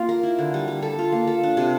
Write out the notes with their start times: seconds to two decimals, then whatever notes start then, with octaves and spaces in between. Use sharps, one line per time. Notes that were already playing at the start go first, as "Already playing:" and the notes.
Already playing: A#3 F4
0.09 A#4
0.23 E4
0.39 D3
0.54 G3
0.68 G3
0.82 A4
0.99 F4
1.12 A#3
1.27 A4
1.43 D4
1.57 C3